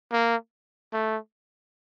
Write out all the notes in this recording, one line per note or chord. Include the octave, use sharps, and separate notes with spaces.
A#3
A3